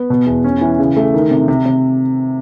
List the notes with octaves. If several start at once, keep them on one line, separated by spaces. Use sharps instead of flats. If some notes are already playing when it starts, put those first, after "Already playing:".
Already playing: B3
B2
E2
C#4
E3
C#3
A3
D#3
C3
C3
C3